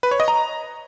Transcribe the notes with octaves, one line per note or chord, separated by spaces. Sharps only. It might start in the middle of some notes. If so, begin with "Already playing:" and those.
B4
C#5
D#5
A#5